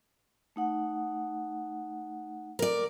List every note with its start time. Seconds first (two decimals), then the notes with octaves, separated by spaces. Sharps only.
0.56 A3 D#4 F#5
2.59 A#4 D5